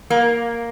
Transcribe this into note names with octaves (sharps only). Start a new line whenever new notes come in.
A#3